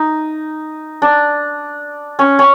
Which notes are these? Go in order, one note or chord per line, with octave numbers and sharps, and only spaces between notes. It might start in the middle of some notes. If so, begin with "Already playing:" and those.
Already playing: D#4
D4
C#4
C#4